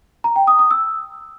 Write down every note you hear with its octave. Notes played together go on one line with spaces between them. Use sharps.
A#5
G5
D#6
D#6
E6